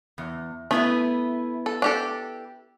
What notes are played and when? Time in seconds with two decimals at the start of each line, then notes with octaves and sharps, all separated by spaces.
0.18 E2
0.71 A3 B3 E4 B4
1.66 A4
1.82 D4 G4 A4